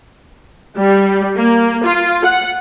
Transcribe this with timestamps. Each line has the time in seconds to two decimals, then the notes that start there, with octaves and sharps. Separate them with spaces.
0.77 G3
1.36 A#3
1.84 F4
2.25 F#5